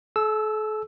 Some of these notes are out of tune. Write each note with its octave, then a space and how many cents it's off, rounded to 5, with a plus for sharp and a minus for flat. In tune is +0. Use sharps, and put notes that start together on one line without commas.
A4 -40 E6 +0